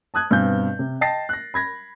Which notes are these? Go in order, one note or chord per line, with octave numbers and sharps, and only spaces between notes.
A5 D#6 F#6 G#6
G2 B2 C4 G#5 G6
C3
D#5 G5 A5 A6 A#6 C7
F#6 A#6
B5 G#6 A#6